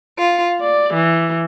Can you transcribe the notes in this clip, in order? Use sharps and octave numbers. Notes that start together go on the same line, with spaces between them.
F4
D5
E3